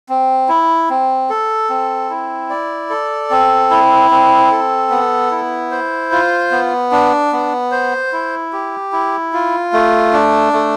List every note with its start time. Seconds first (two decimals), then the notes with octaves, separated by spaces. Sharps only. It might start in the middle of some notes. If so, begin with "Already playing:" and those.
0.09 C4
0.49 E4
0.90 C4
1.30 A4
1.70 C4
2.10 E4
2.50 D5
2.90 A4
3.31 C4
3.71 E4
4.11 C4
4.51 A4
4.90 B3
5.31 E4
5.71 C5
6.12 F4
6.51 B3
6.92 D4
7.32 B3
7.72 C5
8.12 E4
8.53 G4
8.92 E4
9.33 F4
9.73 A3
10.13 D4
10.53 A3